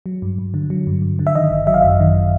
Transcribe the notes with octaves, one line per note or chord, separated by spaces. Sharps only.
F#3
G2
G2
D3
F#3
G2
G2
D3
E5
D#3 D#5
G#1
F#3 E5
F5
F#2 E5
D#3